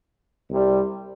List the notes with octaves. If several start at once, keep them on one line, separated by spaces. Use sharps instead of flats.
C2 C3 G3